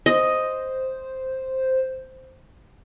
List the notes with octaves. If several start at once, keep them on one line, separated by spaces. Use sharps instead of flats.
C5 D#5